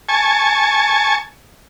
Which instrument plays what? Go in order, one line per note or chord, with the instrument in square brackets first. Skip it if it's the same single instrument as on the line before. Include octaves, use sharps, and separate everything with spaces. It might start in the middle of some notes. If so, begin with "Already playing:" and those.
[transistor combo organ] G#5 A5 C#6